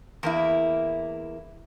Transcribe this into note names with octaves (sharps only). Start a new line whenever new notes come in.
E2 A#3 E4